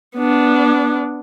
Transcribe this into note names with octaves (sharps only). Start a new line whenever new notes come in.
B3 D4